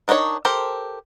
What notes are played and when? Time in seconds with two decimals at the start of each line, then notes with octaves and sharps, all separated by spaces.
0.08 D#3 D4 D#4 F4 C#5
0.45 G4 A4 A#4 C5